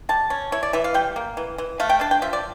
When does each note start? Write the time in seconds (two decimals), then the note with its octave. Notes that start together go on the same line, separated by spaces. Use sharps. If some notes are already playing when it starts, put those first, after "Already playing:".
0.09 G3 A5
0.30 C#4
0.52 E4 C#5
0.63 D5
0.73 E3 E5
0.84 F5
0.94 G3 G5
1.16 A#3
1.37 E3
1.58 E3
1.80 A3 F5
1.89 G5
2.01 D4 A5
2.11 G5
2.22 F3 E5
2.33 D5